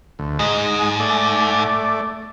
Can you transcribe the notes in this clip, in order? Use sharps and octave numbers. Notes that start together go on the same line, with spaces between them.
D2
G#2 G#3 D#5
A3 D5